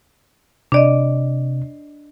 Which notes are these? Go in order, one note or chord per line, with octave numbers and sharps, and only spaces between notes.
C3 D4 D5 D#5